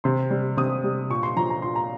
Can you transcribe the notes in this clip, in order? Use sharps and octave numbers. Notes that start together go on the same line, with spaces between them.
C3 C6
G3
C3 D#6
G3
A#2 C#6
C6
F3 A#5
A#5
A#2 C6
A#5